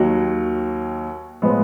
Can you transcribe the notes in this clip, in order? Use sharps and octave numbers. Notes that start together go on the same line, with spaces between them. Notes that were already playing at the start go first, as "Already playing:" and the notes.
Already playing: D#2 D#3 F#3
A2 F3 G#3 B3